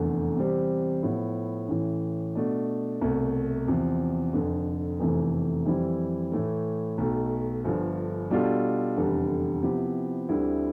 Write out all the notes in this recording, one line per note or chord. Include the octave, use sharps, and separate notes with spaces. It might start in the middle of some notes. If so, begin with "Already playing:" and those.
Already playing: F1 E2 D3 A3
E2 C3 G3 C4 G4
A2 F3 B3
A1 A2 E3
B2 A3 D4
C2 B2 A3
E2 C3 F3
F1 F2 D3
F1 E2 C3 E3 A3
F2 E3 G3 C4 E4
A2 E3 A3
B1 B2 A3
G1 G2 D3 F3
B2 G3 D4 F4 A4
F1 E2 D3 G3
C3 F3 B3 E4 G4
D2 D3 G3 C4 E4